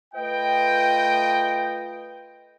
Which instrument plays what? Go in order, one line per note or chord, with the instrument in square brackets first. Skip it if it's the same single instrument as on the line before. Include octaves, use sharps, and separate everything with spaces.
[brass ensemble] A3 F4 B4 D#5 G5